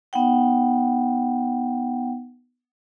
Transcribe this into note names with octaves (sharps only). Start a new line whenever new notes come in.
B3 D#4 F#5 G5